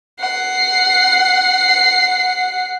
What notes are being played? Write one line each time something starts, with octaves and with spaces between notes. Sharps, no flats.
F#5 C7